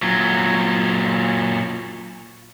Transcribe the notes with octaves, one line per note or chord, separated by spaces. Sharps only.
A#2 F#3